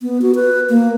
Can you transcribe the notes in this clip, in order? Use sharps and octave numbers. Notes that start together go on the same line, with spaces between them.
B3
F#4
B4
A#3